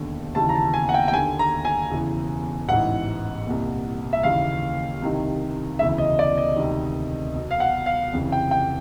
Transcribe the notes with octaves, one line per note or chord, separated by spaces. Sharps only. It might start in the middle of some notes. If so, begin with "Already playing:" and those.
Already playing: E1 D#2 D3
D#2 C#3 E3 A5
A#5
A5
G#5
F#5
G5
G5
D#2 D3 G#5
A#5
G#5
E1 E2 C#3 E3
A1 G#2 E3 F#5
C2 A#2
E5
D#2 C#3 E3 F5
C2 C3 D#3
E1 D2 C#3 E3 E5
D#5
D5
D#5
D2 C3 D#3
B1 B2
F5
F#5
F5
F1 F2 C#3 E3
G5
G5